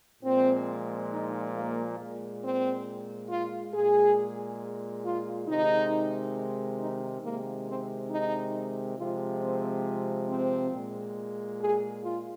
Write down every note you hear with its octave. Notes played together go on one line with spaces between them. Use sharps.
A#2 F3 G#3 C4
D#4
A#3
A#2 G#3
C4
F4
A#2 G#3 G#4
F4
C3 D#3 G#3 D#4
D#4
C3 D#3 G#3 A#3
C4
D#4
C3 F3 G#3 F4
C4
C4
A#2 G#3
G#4
F4